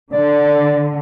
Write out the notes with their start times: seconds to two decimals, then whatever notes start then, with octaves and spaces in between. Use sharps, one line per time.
0.13 D3 D5